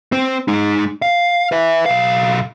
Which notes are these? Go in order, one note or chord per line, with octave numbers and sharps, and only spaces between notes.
C4 C5
G#3 D#4
F5
B4 E5
B1 F5